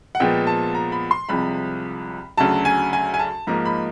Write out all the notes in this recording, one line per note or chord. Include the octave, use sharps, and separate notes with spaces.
F#5
A#2 F3 G#3 B3 G5
A5
A#5
B5
C6
C2 C3 F3 G#3 B5
D2 C#3 F#3 A5
G#5
G#5
G#5
A5
G#2 F3 A#3 D#4 A#5
B5